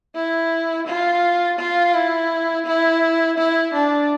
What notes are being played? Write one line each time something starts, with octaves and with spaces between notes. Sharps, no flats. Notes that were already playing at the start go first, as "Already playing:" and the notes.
E4
F4
F4
E4
E4
E4
D4